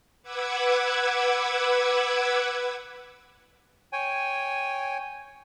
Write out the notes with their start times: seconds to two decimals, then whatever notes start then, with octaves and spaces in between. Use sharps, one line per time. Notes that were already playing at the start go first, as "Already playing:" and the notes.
0.23 B4 F#5 D6 E6 G#6
3.93 C#5 G5 G#5